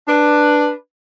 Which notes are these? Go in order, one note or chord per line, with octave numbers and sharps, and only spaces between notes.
D4 B4